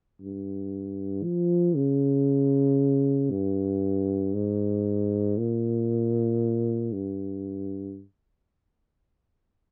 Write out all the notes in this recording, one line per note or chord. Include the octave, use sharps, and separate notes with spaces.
G2
F3
C#3
G2
G#2
A#2
G2